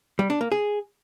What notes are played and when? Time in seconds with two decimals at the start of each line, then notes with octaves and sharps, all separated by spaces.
0.19 G3
0.30 D4
0.41 A#3
0.52 G#4